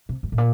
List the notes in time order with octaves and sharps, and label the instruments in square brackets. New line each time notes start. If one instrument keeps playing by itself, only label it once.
[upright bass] C3
F#2
A2
A#2